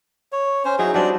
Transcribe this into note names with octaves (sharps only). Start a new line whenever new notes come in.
C#5
C#4 C5
F#3 D#4 E4 G#4
F#3 G3 C4 D4 D5